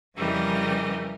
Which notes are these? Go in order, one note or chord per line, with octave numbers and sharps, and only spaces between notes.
F2 C#3 E3 G3 A#4 D#5